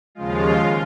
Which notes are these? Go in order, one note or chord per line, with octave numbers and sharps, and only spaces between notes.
D#2 C#3 F3 G#3 F4